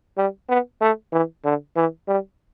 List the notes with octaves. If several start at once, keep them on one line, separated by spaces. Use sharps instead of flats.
G3
B3
A3
E3
D3
E3
G3